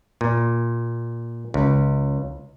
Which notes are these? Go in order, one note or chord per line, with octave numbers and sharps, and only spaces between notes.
A#2
C#2